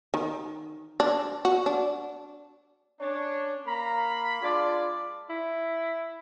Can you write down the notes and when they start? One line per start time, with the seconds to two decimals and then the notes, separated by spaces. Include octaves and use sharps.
0.14 D#3
1.00 D4
1.45 F#4
1.66 D4
3.00 C#4 D4 C#5
3.66 A#3 A#5 B5
4.42 G#3 D4 F4 D5
5.29 E4